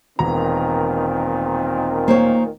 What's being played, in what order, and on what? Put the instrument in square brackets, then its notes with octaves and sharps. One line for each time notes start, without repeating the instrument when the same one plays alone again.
[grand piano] E1 A#5 [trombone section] A#2 D#3 [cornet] C4
[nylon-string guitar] A#3 C5 C#5